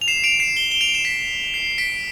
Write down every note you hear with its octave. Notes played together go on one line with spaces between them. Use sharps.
F7
C7 E7
D7 F7
C7 E7
G7
E7 G7
D7 F7
E7
B6 D7
C7
B6 D7